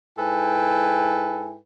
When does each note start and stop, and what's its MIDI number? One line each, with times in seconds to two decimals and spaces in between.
0.17 1.57 44
0.17 1.57 64
0.17 1.57 69
0.17 1.57 71
0.17 1.57 79
0.17 1.57 80